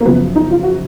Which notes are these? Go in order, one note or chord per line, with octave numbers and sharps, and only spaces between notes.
A#3
F#2 C#3 F3 B3
D#4
F4
F#4